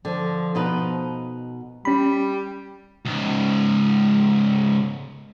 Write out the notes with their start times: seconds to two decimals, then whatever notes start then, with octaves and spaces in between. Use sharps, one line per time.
0.05 D3 F3
0.55 B2 D#4 B4
1.85 G3 C#4 B5
3.06 C#2 G#2